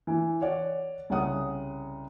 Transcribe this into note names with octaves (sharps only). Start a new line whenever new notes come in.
E3
C#5 D5 F#5
C2 C#3 C#4 F#5 D#6